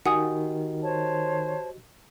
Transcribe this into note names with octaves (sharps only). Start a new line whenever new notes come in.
D#3 F#4 G4 D#5 F#5 G#5 D#6
C5 C#5 A5